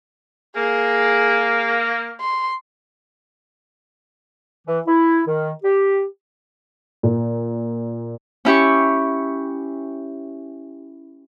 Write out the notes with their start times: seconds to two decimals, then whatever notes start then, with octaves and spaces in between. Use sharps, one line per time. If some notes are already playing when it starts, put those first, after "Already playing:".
0.56 A#3 G#4
2.21 C6
4.67 E3
4.87 E4
5.27 D#3
5.64 G4
7.03 A#2
8.45 C#4 E4 G4 C#6